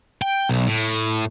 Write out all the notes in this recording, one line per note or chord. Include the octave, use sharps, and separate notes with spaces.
G5
B1
A2